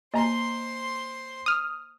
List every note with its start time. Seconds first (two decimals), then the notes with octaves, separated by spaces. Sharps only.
0.14 A#3 C5 D#5 G#5 A#5 C6
1.46 D#6 F6